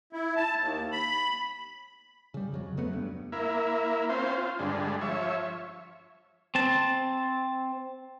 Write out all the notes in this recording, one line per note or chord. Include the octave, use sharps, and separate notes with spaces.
E4
A5
D#2
B5
C#3 G3
F2 C#3 F#3
F2 F#3 A3 B3
G2
A#3 E4
C4 C#4 F4 C5
F4
G2 D3 G#3
F3 C#5 E5
C4 A5